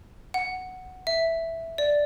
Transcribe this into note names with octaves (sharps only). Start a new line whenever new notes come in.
F#5
E5
D5